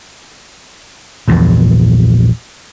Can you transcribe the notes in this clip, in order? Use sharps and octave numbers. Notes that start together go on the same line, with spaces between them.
A#1 E2 G2 A#2